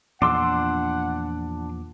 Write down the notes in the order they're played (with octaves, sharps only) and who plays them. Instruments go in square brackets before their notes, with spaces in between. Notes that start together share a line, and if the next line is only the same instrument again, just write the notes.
[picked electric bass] E2 A#2 F3 [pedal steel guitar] D4 C6 E6 [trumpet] F#5 [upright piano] D6